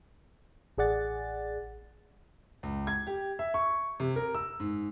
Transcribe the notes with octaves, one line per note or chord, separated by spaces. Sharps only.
A1 G#4 D5 F#5 A6
C#2
G#6
G4
E5
C#6
C3
A#4
E6
G#2